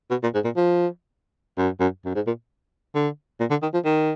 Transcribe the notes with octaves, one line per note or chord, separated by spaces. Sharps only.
B2
A#2
G#2
A#2
F3
F#2
F#2
F#2
G#2
A#2
D3
A#2
D3
D#3
F3
D#3